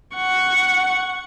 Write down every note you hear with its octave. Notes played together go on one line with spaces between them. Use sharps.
F#5 C#6